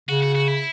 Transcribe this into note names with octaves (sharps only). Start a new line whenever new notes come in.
C#3 F#4
F#4
F#4
E4